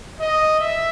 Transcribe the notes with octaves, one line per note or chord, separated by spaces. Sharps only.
D#5
E5